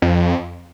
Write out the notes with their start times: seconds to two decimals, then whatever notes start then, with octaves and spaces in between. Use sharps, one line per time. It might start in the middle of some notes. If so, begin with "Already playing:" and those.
0.02 F2